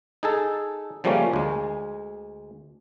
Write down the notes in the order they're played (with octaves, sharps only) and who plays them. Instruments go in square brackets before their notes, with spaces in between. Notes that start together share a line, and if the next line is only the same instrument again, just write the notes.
[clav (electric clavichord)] D#4 G#4 A4
C#3 F3 G3 A3 A#3 C#4
D2 G#3